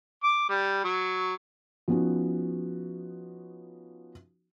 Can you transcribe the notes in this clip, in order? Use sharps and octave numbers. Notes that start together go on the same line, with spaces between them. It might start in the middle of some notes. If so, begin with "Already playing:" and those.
D6
G3
F#3
F3 B3 C#4 D#4 F#4